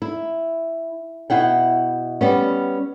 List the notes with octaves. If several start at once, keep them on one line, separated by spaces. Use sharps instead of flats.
E4
B2 E4 F#5 G5
G3 B3 C#4